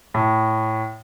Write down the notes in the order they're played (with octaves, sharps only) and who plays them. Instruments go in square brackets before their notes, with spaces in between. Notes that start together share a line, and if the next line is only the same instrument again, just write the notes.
[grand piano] A2